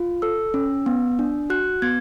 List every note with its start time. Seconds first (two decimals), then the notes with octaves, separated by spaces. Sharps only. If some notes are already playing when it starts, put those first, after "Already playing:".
Already playing: F4
0.22 A4 E6
0.54 C#4
0.86 B3
1.19 D4
1.50 F#4 F#6
1.82 B3 G#6